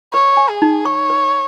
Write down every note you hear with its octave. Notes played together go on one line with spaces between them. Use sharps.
B4 C#5
G#5
G#4
D#4
C#5 C#6
B4